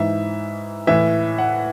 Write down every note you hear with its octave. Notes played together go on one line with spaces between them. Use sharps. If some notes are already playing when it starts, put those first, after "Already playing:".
Already playing: G#2 E3 E5
A2 E3 E5
F#5